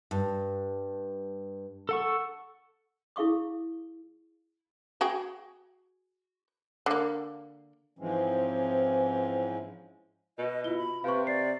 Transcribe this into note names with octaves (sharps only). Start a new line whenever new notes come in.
G2
A4 F#5 C#6
E4 G#4 F5 C#6 D#6
F#4 G#4 G5
D3 A#3
G#2 E3 F3 G#3 C4 C#4
B2 D#5
E4 F4 G7
B5
C3 B4 F5 C#6
D5 C7